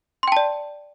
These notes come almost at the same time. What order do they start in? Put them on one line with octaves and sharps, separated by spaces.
C6 G5 A5 D5